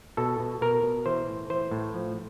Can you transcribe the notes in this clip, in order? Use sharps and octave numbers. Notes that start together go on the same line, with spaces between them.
B2 A4
B2
B2 A#4
B2
E3 C5
A2
E3 C5
A2
F3